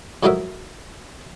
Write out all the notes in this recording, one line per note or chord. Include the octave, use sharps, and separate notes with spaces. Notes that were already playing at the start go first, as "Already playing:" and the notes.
F2 A2 F#3 D#4 A#4 E5